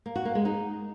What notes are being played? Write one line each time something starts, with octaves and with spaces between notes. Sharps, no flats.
A#3
F#4
A#3
G#3
D#4